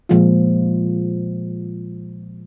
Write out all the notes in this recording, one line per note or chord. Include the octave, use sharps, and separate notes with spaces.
A#2 F3 G#3 F4